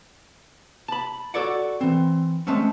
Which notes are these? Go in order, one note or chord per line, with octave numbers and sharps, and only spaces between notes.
A5 B5
F#4 A4 C#5 D5 F#5
E3 C4
G#3 A3 C4 C#4